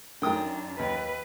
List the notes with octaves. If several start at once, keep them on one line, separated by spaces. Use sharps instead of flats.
F#2 D#3 D4 G5 D#6
D#2 B4